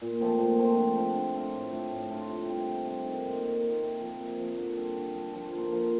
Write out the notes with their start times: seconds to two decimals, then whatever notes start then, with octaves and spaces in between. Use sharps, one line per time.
0.01 A#2
0.20 F3 A3 C4
0.39 A#2
0.59 F3 A3 C4
0.77 D3
0.96 A3 C4 F4
1.16 D3
1.35 A3 C4 F4
1.54 A2
1.72 A3 D4 F4
1.91 A2
2.10 A3 D4 F4
2.29 C3
2.49 G3 C4
2.68 C3
2.87 G3 C4
3.05 D#3
3.25 A#3 F4
3.44 D#3
3.62 A#3
3.68 F4
3.82 C3
4.00 F3 A#3
4.20 C3
4.39 F3 A#3
4.58 D3
4.77 G3 D4 F4
4.95 D3
5.15 G3 D4 F4
5.33 F3
5.52 A#3 F4
5.72 F3